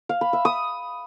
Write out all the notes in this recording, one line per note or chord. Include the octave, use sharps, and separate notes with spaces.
F5
B5
E5
D#6